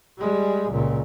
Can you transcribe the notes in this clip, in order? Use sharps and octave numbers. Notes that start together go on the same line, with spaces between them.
G3 G#3
C#2 A#2